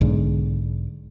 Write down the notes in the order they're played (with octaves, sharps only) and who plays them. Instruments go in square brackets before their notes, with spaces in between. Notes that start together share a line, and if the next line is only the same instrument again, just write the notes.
[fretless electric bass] B1 G#2 D3